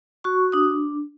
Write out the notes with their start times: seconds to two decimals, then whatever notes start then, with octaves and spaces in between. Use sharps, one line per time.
0.24 F#4 C#6
0.52 D4 D#6